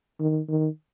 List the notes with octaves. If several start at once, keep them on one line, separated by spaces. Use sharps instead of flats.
D#3
D#3